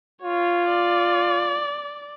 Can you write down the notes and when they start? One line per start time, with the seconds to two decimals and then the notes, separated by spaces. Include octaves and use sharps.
0.22 F4 C#5
0.68 D5